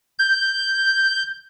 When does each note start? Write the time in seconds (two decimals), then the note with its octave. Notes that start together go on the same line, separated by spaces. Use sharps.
0.19 G6